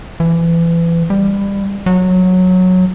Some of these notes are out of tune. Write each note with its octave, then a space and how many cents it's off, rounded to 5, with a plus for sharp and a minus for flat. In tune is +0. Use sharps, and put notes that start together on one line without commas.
E3 +30
G3 +25
F#3 -10